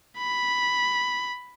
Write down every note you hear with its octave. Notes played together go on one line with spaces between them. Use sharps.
B5